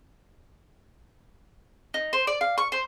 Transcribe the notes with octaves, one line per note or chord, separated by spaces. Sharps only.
D#4
C5
D5
F5
C#6
C5